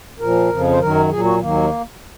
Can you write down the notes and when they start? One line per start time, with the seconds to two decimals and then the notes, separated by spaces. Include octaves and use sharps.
0.19 A#2 F3 A#4
0.49 F2 C#3 F3
0.71 C5
0.80 F#2 D#3 F#3 A#4
1.10 A#2 F#3 G#4
1.24 F#4
1.40 D#2 D#3 F#3 A#3